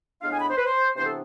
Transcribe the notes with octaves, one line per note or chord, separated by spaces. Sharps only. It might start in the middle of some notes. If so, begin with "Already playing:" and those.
A2 G#3 B3 D4 F5
G#5
B5
C5
B4
C5
C3 E3 B3 D4 C5
A4